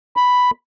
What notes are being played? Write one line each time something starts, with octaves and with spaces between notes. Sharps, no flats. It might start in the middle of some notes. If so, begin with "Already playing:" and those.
B5